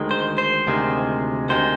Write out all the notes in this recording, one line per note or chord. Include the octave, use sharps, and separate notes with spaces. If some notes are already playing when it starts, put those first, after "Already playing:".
Already playing: D2 D#3 G#3
C5
C5
D2 C3 D#3 G#3
D2 C3 D#3 G#3 C5